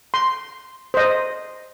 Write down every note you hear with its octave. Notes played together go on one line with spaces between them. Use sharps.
C6
C5 D#5